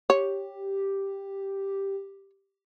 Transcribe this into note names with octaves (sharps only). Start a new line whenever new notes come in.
G4 C#5